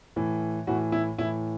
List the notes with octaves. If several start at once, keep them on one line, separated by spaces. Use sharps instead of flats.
A2 E3
A2 E3 F#4
E4
A2 E3 E4